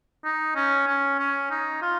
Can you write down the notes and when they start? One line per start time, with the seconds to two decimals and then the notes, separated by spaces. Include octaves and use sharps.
0.25 D#4
0.56 C#4
0.87 C#4
1.19 C#4
1.51 D#4
1.82 F4